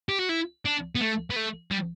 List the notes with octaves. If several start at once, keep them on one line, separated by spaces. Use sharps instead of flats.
G4
F#4
E4
D4
B3
A3
B3
A3
G3